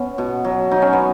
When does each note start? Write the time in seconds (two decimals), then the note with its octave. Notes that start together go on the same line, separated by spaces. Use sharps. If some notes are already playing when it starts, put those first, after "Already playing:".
Already playing: B3 C#4
0.18 B2
0.45 F#3
0.71 F#3 D#4
0.82 C#4
0.93 B3